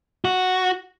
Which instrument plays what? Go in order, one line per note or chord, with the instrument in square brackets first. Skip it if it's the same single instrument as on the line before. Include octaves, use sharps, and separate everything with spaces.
[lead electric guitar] F#4